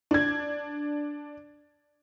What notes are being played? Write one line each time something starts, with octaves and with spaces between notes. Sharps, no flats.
D4 G#6